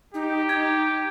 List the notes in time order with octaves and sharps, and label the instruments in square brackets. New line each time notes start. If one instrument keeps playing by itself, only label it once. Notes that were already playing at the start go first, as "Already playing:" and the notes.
[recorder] D#4 [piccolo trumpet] G4
[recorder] D#4 [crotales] G#6